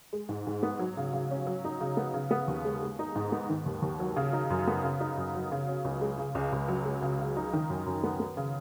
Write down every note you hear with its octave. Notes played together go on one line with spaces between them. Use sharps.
G#3
G#2
G#2
B3
F#3
C#3
C#3
C#4
F#3
D#4
C#3
B3
C#3
B3
D#2
G#3
G#3
D#4
G#2
B3
D#3
D#2
D#2
F#3
C#3
D#4
F#2
B3
C#3
D#4
F#2
F#3
C#3
C#4
C#2
G#3
C#3
C#2
C#2
F#3
G#3
C#3
C#3
D#4
D#3
F#2
F#2
B3
B3
C#3